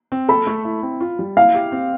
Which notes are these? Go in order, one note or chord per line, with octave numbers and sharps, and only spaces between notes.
C4
A4 B5
A3
E4
C4
F4
G3
E4 F5
G4
C4